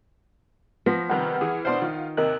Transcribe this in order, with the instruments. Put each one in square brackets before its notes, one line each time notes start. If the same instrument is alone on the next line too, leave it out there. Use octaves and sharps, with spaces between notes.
[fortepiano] F3 [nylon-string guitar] B3 [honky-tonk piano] A#6 B6
[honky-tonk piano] C3 D#3 G3 [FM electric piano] F#5 F6
[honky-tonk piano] E3 [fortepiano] G#4
[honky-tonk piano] B2 D4 E4 [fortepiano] C5 C6
[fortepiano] D#3 [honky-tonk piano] F4
[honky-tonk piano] D#2 C3 [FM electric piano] A#4 D#5 F#6